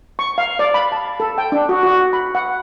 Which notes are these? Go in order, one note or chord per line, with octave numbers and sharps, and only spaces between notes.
C#6
F5
D5
B5
A5
A4
G5
D4
F#4
F#4
B5
F#5